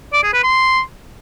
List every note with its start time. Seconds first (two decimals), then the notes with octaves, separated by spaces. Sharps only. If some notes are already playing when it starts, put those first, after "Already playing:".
0.13 D5
0.23 G#4
0.33 B4
0.43 C6